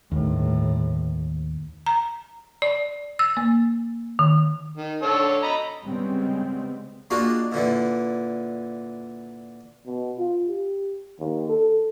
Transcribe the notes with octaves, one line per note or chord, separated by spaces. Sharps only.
G1 D#2 A2
A#5
D5
E6
A#3
D#3
D#3
D3 A4 C#5
D#5 A#5 B5
C#3 G3 G#3 B3 C4
G#3 A#3 D4 F4 F#4
A#2 D3 E3
B2
F4
G4
D#2
A4